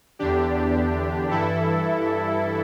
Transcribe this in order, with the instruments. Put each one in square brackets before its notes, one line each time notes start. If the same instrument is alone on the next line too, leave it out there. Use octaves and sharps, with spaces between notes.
[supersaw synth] E2 D3 D4 G4
G2 E3 E4 A4